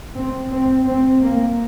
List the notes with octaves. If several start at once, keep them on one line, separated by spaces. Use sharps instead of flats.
C4
C4
C4
A#3